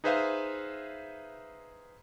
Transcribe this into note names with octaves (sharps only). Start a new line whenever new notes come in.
D#4 G#4 B4 C5 E5 F5